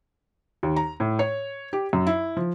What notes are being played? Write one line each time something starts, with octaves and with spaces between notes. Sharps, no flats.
D#2
A#5
A2
C#5
G4
F#2
E4
F3